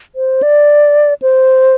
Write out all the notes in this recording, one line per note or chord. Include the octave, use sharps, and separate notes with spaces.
C5
D5
C5